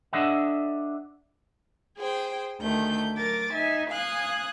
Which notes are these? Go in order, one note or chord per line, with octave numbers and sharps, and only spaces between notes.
D4 A4 D#5 E5 F#5
G#4 C5 G5
D2 D#3 A3 G6
F#3 A#4 D6 A6
D#4 E5 G#5
F5 G#5 D#6 F#6